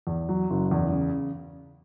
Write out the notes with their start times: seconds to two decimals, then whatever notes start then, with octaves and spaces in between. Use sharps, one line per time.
0.07 E2
0.29 F#3
0.50 F#1
0.71 E2
0.92 C#3